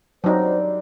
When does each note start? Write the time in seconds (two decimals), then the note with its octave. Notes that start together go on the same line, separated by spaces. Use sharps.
0.24 F#3 G3 C4 D4 D#4 C5